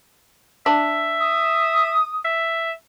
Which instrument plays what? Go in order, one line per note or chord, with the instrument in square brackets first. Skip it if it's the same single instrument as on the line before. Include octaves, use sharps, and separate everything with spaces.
[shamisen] D4 [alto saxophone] E5
[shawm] D#6
[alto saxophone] E5